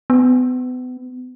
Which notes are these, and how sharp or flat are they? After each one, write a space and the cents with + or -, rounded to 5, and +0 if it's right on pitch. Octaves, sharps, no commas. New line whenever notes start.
B3 +35